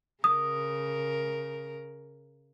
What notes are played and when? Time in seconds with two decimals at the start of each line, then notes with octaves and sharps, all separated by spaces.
0.24 C#3 A#4 D#6